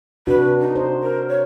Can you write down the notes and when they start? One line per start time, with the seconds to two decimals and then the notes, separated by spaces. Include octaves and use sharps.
0.27 C3 D4 F#4 B4
0.60 D#4
0.76 C5
1.02 A#4
1.29 C#5